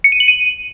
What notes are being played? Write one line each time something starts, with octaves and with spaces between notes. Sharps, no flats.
C#7
D#7
F#7
D#7